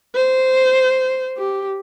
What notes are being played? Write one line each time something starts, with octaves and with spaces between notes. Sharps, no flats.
C5
G4